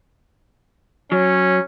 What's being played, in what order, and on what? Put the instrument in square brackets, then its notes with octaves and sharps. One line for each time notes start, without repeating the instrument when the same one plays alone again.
[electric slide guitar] F#3 [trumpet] C#4